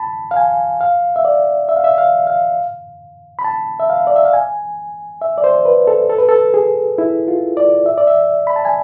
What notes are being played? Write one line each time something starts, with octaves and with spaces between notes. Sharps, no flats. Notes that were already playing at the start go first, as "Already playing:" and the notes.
Already playing: A5 B5
F5
G#5
F5
E5
D5
E5
F5
E5
F5
F5
B5
A5
E5
F5
D5
E5
F5
G#5
E5
D5
C5
B4
A4
A4
B4
A4
G#4
E4
F4
D5
E5
D5
E5
B5
A5
G#5